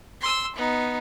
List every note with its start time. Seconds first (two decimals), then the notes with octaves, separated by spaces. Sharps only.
0.21 C6 E6
0.56 B3 D#4